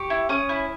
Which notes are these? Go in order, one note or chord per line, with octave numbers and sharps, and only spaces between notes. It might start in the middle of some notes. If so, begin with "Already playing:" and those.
Already playing: G4 C#6
E4
C#4 D#6
E4